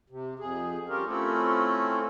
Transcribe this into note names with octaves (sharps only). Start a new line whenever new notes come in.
C3
F2 G#4
G3 C#4 F4 G4 A#4
A3 C4 C#4 E4 F4 A4